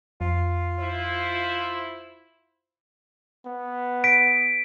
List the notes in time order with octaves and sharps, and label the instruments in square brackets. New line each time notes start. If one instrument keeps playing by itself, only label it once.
[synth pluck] F2 [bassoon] F4
[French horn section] E4 C5
[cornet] B3
[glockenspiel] B6 D7